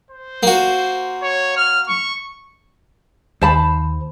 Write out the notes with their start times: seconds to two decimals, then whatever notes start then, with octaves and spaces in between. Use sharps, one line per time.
0.11 C5
0.43 A#3 F#4
1.22 C#5
1.57 F6
1.88 C#6
3.41 D#2 C5 A5 B5